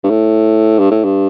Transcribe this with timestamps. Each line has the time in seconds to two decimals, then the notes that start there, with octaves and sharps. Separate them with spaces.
0.04 G2
0.10 A2
0.79 G2
0.91 A2
1.04 G2